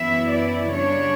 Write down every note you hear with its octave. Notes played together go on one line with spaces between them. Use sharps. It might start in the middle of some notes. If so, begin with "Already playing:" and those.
Already playing: F#2 E3 B3 E4 E5
D5
C#3 G3 D4 C#5